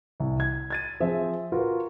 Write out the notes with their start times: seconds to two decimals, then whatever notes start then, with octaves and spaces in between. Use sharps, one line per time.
0.20 C2
0.40 G#6
0.70 G#6 A6 D#7
1.00 F3 C4 G#4 E5
1.52 F4 F#4 A#4 B4